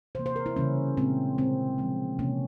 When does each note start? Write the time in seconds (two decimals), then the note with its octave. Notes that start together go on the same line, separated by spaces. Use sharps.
0.15 C3 E3 A#3 C5
0.26 C5
0.36 A#4
0.46 E4
0.56 C#3 E3 G3 A#3 C#4
0.97 A#2 G#3 C4
1.38 A#2 G#3 C4
1.78 A#2 F3 G#3
2.19 C3 E3 A#3 C#4